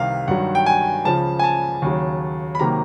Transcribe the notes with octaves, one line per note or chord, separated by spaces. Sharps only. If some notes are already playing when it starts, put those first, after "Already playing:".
Already playing: C2 C3 D#3 F5
G2 D#3 F#3 F#5
G5
G#5
C#2 C#3 F3 A5
G#5
A5
D#2 C#3 F#3
B5
C3 D#3 F#3 A#3 A#5